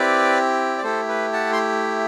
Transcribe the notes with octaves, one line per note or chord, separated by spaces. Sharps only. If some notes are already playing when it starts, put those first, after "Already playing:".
Already playing: C4 E4 G4 B4 D5
D5
A3 E4 G4 A4 C5
B4
F#5 A5
C6